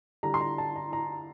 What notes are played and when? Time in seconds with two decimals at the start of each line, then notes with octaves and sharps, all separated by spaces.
0.23 D3 G3 D4 A#5
0.34 C6
0.41 A#5
0.58 A5
0.76 A#5
0.93 A#5